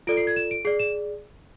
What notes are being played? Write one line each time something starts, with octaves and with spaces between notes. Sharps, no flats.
F4 A4 D5 D7
C7
G#6
E7
D7
G#4 D5 C7
E7